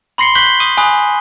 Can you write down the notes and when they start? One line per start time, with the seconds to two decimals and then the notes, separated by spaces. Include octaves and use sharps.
0.18 B5 C6 A#6 C7 C#7 G7
0.35 C#6 F#6 G6 B6 F#7 G7
0.60 C#6 D#6 D#7
0.77 G#5 B5 D#6 F#6